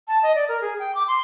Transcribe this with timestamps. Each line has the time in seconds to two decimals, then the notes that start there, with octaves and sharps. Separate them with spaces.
0.08 A5
0.23 D#5
0.35 D5
0.48 A#4
0.61 G#4
0.79 G5
0.95 D6
1.08 C6